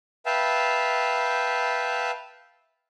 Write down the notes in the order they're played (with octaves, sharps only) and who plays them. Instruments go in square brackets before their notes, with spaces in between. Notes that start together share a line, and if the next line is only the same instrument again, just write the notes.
[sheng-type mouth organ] B4 E5 F5 G5 A5